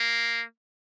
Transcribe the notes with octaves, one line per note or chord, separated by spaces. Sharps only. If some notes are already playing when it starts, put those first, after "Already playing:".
Already playing: A#3